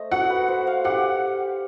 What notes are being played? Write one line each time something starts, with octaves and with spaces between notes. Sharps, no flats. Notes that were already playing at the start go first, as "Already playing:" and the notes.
Already playing: A3 C5 D#5
F#4 F#5
B4
C5
F5
G4 F#5